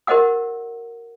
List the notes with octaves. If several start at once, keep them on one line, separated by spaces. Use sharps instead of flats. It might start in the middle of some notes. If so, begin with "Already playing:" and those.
F#4 A#4 C5 D#5 F#5 E6